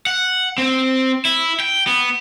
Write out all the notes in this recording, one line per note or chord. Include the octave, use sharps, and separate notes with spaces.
F#5
C4
E4
G5
B3